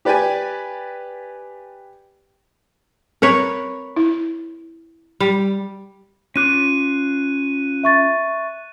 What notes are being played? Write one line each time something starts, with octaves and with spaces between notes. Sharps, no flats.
G4 B4 D5 G5 G#5
C4 A#4 B4 C#5
E4
G3
C#4 F4 D6 F#6 D#7
E5 C#6 A6